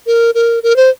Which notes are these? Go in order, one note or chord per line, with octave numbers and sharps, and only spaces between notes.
A#4
A#4
A#4
C5